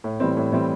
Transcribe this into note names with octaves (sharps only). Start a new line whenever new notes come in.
A2
E3 G3 C4
A2
E3 G3 C4